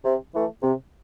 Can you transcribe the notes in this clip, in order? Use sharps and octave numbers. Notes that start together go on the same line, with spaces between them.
C3
E3 A3
C3